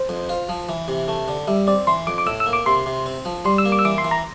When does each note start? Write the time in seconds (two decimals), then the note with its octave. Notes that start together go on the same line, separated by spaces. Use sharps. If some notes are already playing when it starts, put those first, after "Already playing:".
Already playing: C5
0.09 F2
0.29 F4
0.49 F3
0.69 E3
0.88 C3
1.08 A3
1.28 D3
1.47 G3 E5
1.67 C4 D5
1.87 E3 C6
2.07 F2 D6
2.18 D6
2.27 A2 E6
2.40 E6
2.46 A#3
2.53 D6
2.66 C3 C6
2.86 C3
3.06 C4
3.25 F3
3.45 G3 C6
3.58 E6
3.65 A#3
3.72 D6
3.79 E6
3.85 E3 D6
3.98 C6
4.05 E3
4.11 A#5